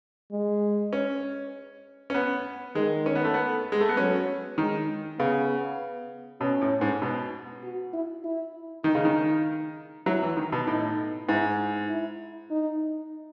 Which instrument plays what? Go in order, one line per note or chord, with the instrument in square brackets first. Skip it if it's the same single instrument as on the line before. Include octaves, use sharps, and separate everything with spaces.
[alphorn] G#3
[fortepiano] C#4
C#4
B3
[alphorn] D#3 [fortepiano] G#3
[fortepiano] C#4
B3
A3
B3
G#3
A3
B3
[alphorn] F#3 [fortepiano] C#4
[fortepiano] D#3 [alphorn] G#3
[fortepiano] C#3 [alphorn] B3
[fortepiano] B2 [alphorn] C#4
[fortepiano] A2
G#2
B2
[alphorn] F#4
E4
E4
[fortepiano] D#3 [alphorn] D#4
[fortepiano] C#3
D#3
[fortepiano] F#3 [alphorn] E4
[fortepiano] E3
D#3
B2
[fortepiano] A2 [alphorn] D#4
[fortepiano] G#2 [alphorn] E4
[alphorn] E4
D#4